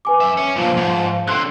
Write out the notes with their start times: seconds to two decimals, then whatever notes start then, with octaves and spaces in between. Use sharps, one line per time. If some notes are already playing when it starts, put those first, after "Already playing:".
0.05 B4 G#5 D6
0.20 F#2 E5
0.37 C#4
0.56 G2 A#2 F3
0.77 G#2
1.28 D3 C4 C6 F#6